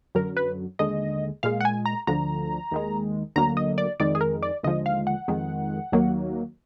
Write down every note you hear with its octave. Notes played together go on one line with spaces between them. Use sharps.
F#2 D3 F#3 A#4
B4
D#2 D3 G#3 D#5
A#2 G#3 F5
F#5
G#5
A#5
D2 D3 F3 A#5
D#2 D#3 G#3
D2 D3 F#3 A#3 A#5
D#5
D5
F2 D#3 G#3 D5
G#4
A#4
D5
D#2 D3 F3 G#3 D#5
F5
F#5
F2 D#3 G#3
D#2 D#3 F#3 A#3